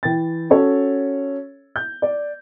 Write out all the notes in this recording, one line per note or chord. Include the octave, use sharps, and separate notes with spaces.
E3 G5 A6
C#4 F#4 A4 C#5
G6
D5